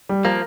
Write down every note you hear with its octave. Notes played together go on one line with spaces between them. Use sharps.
G3
F3 A#3 A#4